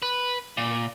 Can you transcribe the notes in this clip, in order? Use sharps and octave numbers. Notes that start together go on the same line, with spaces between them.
B4
A#2